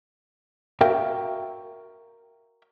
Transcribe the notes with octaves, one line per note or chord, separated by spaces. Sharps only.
F#4 A#4 E5 F5 G5